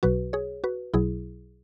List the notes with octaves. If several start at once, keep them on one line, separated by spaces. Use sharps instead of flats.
B1 B2 F#3 F#4 B4
G#4 C#5
F#4 B4
B1 B2 F#3 E4 G#4